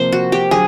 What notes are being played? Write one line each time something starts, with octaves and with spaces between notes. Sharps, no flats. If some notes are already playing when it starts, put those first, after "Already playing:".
Already playing: C3 F3 A#3 C5
F#4
G4
D3 F#3 G#4